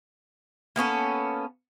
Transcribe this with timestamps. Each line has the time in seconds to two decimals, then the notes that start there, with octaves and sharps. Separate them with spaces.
0.76 A#3 B3 C#4 A4